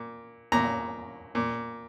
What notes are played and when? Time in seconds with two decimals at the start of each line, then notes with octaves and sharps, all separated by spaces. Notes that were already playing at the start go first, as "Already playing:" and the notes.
Already playing: A#2
0.52 A#2 A#5
1.35 A#2